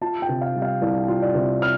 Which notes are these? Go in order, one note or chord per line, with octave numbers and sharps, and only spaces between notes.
F4 A5
G5
C3
F5
G3
F5
C2 D5
F4
D5
C3
F6